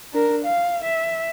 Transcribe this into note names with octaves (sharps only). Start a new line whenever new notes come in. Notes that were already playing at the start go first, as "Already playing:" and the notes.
D4 A#4
F5
E5